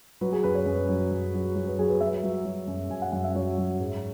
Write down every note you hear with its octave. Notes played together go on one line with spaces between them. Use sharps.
F#3 B4
G#4
F#2 B4
C#5
F#2
F#3
F#2
F#3
F#3
B4
F#3 G#4
B4
F#3 E5
F#3
F#3
F#2
F#2 G#5
F#5
F#2 F#5
E5
F#3 C#5
F#3
G#2